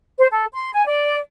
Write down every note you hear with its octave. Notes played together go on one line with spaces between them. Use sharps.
C5
A4
C6
G#5
D5